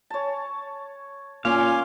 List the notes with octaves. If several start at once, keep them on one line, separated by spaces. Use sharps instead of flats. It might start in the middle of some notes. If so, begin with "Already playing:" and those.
C#5 A5
A#2 C#4 F5 G#5 C6 D6